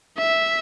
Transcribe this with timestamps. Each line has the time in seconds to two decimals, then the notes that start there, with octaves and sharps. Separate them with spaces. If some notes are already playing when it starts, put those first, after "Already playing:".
0.18 E5